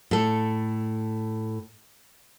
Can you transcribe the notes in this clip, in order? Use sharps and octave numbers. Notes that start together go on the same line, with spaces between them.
A2 A4